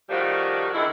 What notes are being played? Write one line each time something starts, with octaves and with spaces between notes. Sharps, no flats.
A2 D#3 F3 G3 F#4
D3 D#3 G#3 E4